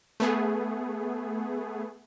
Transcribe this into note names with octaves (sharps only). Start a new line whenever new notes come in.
A3 B3 G#4